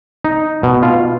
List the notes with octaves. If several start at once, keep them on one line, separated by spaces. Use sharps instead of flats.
D#4
B2
F4